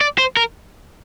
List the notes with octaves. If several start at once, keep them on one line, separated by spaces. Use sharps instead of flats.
D5
C5
A#4